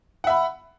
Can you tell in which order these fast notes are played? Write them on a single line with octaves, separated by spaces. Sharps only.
F#5 E5 B5